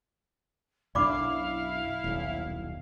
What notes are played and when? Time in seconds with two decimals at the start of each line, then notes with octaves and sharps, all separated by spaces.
0.95 B1 F#2 D4 E4 D5 F5 B5 D6
2.04 D#1 B1